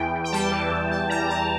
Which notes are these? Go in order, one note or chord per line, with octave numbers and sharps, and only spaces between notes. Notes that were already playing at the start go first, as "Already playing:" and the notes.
Already playing: E2 E3 G5
E2
G5
G3 A5
E3
E2
E2 A5
G3 A#5
E3 A5